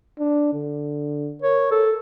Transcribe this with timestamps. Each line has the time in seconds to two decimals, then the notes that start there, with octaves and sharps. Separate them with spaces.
0.19 D4
0.53 D3
1.42 A#4 C#5
1.71 A4